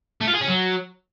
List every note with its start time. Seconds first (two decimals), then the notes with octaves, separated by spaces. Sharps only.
0.21 A3
0.28 F4
0.34 G#4
0.41 C#4
0.48 F#3